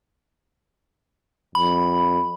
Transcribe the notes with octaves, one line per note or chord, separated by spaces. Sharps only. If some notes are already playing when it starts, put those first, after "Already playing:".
F2 B5